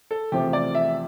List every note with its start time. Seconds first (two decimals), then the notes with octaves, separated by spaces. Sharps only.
0.11 A4
0.32 E2 C3 F3 A3 G4
0.53 D5
0.75 E5